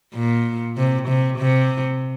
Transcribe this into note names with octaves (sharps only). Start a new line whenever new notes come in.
A#2
C3
C3
C3